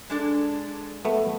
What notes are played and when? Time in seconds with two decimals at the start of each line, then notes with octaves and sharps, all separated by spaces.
0.10 G#3 D4 A4
1.05 A3 B3